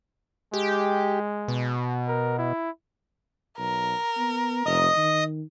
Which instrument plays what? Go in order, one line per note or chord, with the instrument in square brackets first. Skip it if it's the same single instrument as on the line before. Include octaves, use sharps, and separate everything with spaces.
[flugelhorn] G#3 [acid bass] G4
[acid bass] B2
[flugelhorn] A#4
E4
[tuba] B1 [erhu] A#4
[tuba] B3
[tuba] F1 [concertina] D#5 D#6
[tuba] D#3